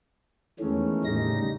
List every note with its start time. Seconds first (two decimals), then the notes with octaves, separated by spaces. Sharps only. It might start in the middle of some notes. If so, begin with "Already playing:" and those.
0.59 E2 D#3 E3 G#3 A3 C#4
1.05 A2 C#3 G3 D#4 A#6